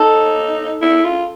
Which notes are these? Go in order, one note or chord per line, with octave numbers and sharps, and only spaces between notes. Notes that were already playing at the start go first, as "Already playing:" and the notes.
Already playing: D#4 A4
E4
F4